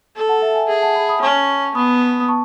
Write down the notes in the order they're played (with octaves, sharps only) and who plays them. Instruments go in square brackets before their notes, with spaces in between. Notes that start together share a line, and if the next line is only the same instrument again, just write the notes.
[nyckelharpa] A4
[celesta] F#5 A5
E5
E5 G#5
[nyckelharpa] G#4 [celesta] E5 G#5
[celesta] F#5 A5
G#5 B5
B5 D#6
[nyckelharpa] C#4 [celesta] A5 C#6
[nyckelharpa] B3 [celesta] B5 D#6
[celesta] D#6
A5 C#6